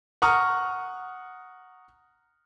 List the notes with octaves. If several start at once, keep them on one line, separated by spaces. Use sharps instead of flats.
F#5 A#5 C#6 D#6 F6